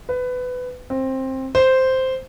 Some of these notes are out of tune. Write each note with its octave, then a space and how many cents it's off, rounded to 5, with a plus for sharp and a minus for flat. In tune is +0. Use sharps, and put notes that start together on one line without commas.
B4 +20
C4 +15
C5 -5